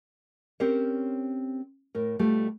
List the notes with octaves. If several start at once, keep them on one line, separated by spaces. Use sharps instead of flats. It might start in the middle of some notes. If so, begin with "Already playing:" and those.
C4 C#4 G4 A#4 C5 C#5
A2 A#4
B2 G3 A3 F4 G4